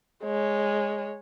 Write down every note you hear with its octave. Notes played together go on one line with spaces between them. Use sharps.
G#3 C#5